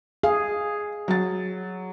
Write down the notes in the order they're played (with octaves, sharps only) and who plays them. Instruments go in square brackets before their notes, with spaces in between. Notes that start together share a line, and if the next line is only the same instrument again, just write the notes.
[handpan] G#4 [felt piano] F5
[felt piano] F#3 A6